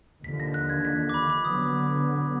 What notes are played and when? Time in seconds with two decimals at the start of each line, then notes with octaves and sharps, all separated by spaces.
0.24 D#2 D3 F3 B6
0.40 A#6
0.54 F#6
0.69 G#6
0.85 B6
1.09 D6
1.14 B5
1.30 B5
1.45 D3 F#3 B3 D#6